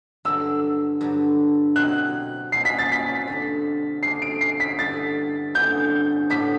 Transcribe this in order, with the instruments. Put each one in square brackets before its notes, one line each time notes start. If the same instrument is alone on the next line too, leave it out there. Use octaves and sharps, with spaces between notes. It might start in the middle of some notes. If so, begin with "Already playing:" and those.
[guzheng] G2 D3 F#3 [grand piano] E6
[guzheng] G2 D3 F#3
[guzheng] B2 F#3 C4 E4 [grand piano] F#6
[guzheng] B2 F#3 C4 E4 [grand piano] C7
[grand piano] B6
A6
B6
[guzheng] D3 G3 D4
[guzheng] D3 G3 D4 [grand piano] C7
[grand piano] D7
C7
B6
[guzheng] G2 D3 G3 B3 E4 [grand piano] A6
[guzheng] G2 D3 G3 B3 E4 [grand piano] G6
[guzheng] A2 G3 B3 D4 [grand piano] B6